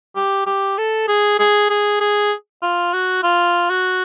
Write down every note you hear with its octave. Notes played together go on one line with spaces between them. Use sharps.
G4
G4
A4
G#4
G#4
G#4
G#4
F4
F#4
F4
F#4